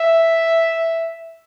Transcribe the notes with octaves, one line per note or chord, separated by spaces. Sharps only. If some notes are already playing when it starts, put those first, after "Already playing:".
Already playing: E5